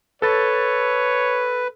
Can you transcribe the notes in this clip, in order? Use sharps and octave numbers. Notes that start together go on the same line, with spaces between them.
A4 B4 C#5 A6